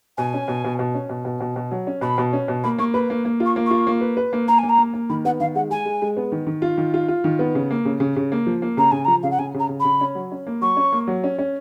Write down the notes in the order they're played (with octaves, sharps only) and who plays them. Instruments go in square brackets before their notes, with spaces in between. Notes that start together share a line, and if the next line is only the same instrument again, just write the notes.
[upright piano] B2 [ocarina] G#5
[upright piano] C#4
B2
B2
B2
C#4
B2
B2
B2
B2
F#3
C#4
[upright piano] B2 [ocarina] B5
[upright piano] B2
C#4
B2
[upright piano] A#3 [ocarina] B5
[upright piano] A#3 [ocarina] C#6
[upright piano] B4 [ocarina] B5
[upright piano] A#3
A#3
F4
[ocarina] C#6
[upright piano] A#3
[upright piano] F4 [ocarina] C#6
[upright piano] A#3
B4
B4
A#3
[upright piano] A#3 [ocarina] A#5
[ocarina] G#5
[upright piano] A#3
[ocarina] A#5
[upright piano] A#3
A#3
[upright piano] D#3 [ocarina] B5
[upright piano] B3 [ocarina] F#5
[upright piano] D#3 [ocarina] F5
[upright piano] G#3 [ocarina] F#5
[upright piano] G#3 [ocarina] G#5
[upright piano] G#3
G#3
B3
D#3
D#3
F4
D#3
F4
F4
D#3
B3
C#3
A#3
C#3
C#3
C#3
A#3
F3
A#3
[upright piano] C#3 [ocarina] A#5
[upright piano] C#3 [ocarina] G#5
[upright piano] F3 [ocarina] A#5
[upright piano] C#3 [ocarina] F5
[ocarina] F#5
[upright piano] C#3 [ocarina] G#5
[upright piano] C#3 [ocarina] A#5
[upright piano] C#3
[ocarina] B5
[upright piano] C#3
C#4
F#3
C#4
A#3
[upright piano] F#3 [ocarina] C#6
[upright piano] C#4
A#3
F#3
C#4
C#4